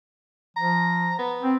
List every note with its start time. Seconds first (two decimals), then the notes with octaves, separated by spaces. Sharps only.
0.57 F3 A#5
1.19 B3
1.43 C4